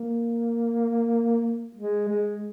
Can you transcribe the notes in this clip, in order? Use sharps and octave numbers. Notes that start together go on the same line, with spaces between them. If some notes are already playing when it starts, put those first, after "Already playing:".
Already playing: A#3
G#3
G#3